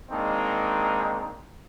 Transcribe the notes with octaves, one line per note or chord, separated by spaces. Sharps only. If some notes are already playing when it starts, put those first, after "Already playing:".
D#3 G#3 A#3 C4 D4 D#4